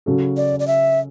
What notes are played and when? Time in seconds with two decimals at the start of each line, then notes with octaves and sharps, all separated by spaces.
0.06 C#3 F#3 C#4 F#4 A4
0.37 D5
0.60 D5
0.67 E5